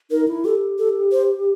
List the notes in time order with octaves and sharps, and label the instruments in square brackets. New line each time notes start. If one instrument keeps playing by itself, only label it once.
[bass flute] D#4 [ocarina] A#4
[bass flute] E4
[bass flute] G4 [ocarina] A4
[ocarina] A4
C5